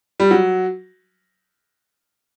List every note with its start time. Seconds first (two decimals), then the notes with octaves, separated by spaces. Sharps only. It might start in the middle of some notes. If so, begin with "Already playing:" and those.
0.20 G3
0.31 F#3